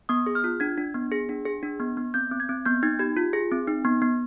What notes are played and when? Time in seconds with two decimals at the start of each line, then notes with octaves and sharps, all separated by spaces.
0.09 B3 D#6
0.26 G#4
0.35 F6
0.44 F4
0.60 D4 G#6
0.78 D4
0.94 B3
1.12 G#4
1.29 D4
1.46 G#4
1.63 D4
1.80 B3
1.97 B3
2.14 C4 G6
2.31 C4
2.40 G#6
2.49 C4
2.66 B3 G6
2.83 D#4 G#6
2.99 G4 G#6
3.17 F4
3.33 G#4
3.51 C4
3.68 D#4
3.85 B3
4.02 B3